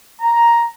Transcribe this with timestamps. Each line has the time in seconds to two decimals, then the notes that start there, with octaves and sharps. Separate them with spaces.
0.21 A#5